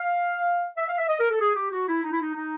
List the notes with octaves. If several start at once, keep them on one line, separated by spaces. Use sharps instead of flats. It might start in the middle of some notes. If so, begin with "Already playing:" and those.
Already playing: F5
E5
F5
E5
D#5
A#4
A4
G#4
G4
F#4
E4
D#4
E4
D#4
D#4